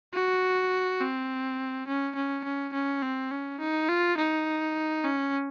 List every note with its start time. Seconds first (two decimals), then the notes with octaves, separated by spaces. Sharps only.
0.13 F#4
1.00 C4
1.87 C#4
2.15 C#4
2.44 C#4
2.73 C#4
3.02 C4
3.31 C#4
3.59 D#4
3.89 F4
4.17 D#4
5.04 C#4